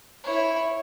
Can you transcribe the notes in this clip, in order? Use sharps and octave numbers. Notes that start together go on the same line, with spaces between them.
E4 C#5